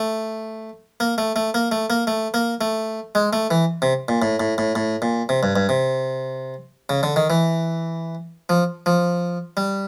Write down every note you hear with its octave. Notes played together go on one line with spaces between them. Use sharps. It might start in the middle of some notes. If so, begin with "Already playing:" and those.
Already playing: A3
A#3
A3
A3
A#3
A3
A#3
A3
A#3
A3
G#3
A3
E3
C3
A#2
A2
A2
A2
A2
A#2
C3
G2
G2
C3
C#3
D3
D#3
E3
F3
F3
G3